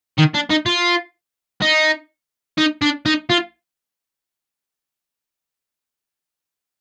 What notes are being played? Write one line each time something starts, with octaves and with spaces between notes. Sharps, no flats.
D#3
D4
D#4
F4
D#4
D#4
D4
D#4
F4